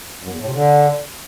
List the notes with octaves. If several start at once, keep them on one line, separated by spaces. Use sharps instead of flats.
F#2
E2
A2
C3
D3